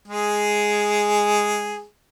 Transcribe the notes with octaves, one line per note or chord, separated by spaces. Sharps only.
G#3 G#4